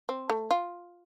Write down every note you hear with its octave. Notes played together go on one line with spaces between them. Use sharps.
C4
A3
F4